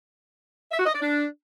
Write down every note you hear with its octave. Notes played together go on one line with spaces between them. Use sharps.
E5
F#4
D#5
D5
D4